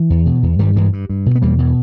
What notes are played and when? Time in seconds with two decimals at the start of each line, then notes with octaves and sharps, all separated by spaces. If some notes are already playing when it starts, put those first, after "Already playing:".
Already playing: E3
0.10 E2
0.26 B2
0.43 E2
0.59 G2 D#3 G3
0.76 G2 E3 G#3
0.93 G2
1.10 G2
1.26 B2
1.35 B3
1.42 E2 G3 A#3
1.58 B2 E3